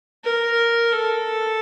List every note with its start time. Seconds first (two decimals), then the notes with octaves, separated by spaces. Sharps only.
0.24 A#4
0.93 A4